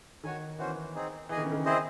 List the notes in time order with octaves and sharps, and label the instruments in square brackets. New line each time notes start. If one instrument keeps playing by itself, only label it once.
[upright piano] D#3 [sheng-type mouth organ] F#4 C#5 G#5
[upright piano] E3 [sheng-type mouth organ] C#4 F#4 C5
[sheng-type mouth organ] C4 D#4 G#4
[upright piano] E3 [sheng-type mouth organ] G#4 D#5 G#5
[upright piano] D#3
C#3
D#3
[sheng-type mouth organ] C4 E4 G#4 C5 D#5